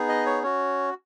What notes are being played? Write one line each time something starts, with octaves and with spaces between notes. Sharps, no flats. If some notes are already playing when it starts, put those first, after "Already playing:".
Already playing: B3 D#4 G#4
D#5
C#5
C#4 F#4 C#5